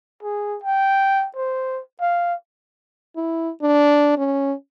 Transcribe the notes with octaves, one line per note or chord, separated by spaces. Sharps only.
G#4
G5
C5
F5
E4
D4
C#4